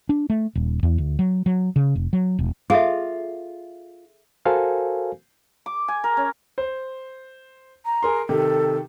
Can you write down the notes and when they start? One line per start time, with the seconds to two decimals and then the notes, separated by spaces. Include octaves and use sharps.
0.09 D4
0.30 A3
0.55 D#1
0.83 E2
0.98 D2
1.19 F#3
1.46 F#3
1.76 C#3
1.95 F1
2.13 F#3
2.39 E1
2.70 F4 G#4 A4 E5
4.45 F#4 A4 A#4 C5 F5 G#5
5.66 D6
5.88 G#5
6.04 A#4
6.17 C#4
6.58 C5
7.86 A#5
8.03 G#4 A#4 C6
8.29 C3 D#3 A4